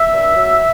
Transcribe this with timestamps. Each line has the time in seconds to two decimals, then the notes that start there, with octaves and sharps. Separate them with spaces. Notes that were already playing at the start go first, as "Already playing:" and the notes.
Already playing: E5
0.12 G2
0.36 F#3